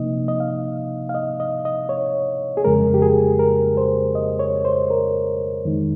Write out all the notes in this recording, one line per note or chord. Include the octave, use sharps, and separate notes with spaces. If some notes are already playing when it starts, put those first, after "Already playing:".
Already playing: C3 F3 A#3 D#4 D#5
D#5
F5
F5
D#5
D#5
D#5
C#5
G#4
F2 C#3 G#3 A#4
G4
G#4
A#4
C5
D#5
C#5
C5
A#4
F2 D#3 G#3 D#4